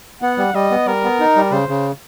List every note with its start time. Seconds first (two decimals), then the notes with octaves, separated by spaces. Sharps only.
0.22 B3 F#5
0.38 G3
0.54 G3 D#5
0.71 B3
0.87 G3 A#4
1.04 B3
1.20 D#4
1.36 G3
1.52 C#3 C5
1.69 C#3